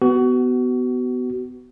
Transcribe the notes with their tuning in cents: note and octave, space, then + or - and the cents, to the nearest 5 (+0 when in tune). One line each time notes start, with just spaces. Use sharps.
B3 +15 F#4 +30